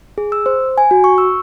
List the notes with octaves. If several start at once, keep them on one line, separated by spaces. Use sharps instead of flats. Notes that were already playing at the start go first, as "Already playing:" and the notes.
G#4
E6
C5
G#5
F#4
C#6
E6